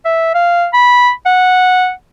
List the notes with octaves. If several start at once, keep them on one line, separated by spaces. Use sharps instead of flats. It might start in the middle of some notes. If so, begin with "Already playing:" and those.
E5
F5
B5
F#5